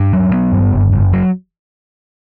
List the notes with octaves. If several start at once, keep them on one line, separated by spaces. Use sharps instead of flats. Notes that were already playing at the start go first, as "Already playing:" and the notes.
Already playing: G2
F#3
B3
G2
F#1
F#1
F#3